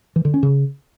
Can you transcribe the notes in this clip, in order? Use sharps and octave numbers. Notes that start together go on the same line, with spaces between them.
E3
D3
C#4
C#3